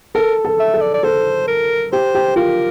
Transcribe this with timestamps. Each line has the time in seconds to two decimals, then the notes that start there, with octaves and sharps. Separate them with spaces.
0.15 A4 A#4
0.45 A4
0.60 E5
0.74 A4
0.81 D5
0.94 D5
1.03 A4 C5
1.48 A#4
1.92 G4 C5
2.15 G4
2.36 F4 A#4